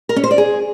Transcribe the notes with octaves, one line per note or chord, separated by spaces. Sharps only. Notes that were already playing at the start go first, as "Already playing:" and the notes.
A#4
C#4
C5
D5
G#4